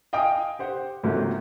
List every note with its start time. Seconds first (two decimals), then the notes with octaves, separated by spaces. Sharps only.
0.13 D#5 F5 G5 G#5 D#6 D7
0.59 G4 C5 F#5
1.03 C#2 G#2 C3 F#3 A3 A#3